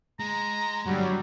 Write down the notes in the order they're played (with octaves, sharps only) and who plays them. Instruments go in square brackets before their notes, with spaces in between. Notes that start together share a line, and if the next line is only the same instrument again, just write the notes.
[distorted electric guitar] G#3 [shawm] A#5
[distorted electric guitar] G2 D3 [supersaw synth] F#3 G3